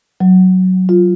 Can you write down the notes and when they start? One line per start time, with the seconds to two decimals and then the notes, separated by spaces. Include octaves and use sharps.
0.20 F#3
0.89 F4